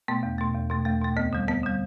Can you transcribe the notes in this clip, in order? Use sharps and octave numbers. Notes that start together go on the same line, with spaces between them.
B2 A3 B3
E2
B2 A3
E2
B2 A3
E2 A3
B2 A3
D2 B3
D3 G3
D2 B3
D3 G3